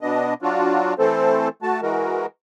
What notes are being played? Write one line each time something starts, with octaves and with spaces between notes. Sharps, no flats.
B2 B3 D4 D#5
F#3 D4 F4 F#4
E3 A3 C4 A4 C5
A3 F#4 A5
E3 G#3 F#4 A#4